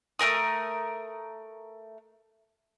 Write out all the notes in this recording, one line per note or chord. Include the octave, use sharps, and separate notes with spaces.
A3 C4 A#4 D#6